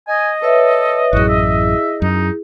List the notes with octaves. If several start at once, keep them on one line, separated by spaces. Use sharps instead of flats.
D#5 G#5
A4 B4 C#5 E5
A1 F#2 E4 F#4 G#4
E5
F#2 D#4